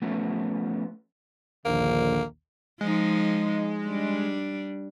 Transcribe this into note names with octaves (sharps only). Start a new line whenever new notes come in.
F3 A3 B3 C#4
A#1 D#2 D3 A#3
F3 G#3 D#4
G3 D4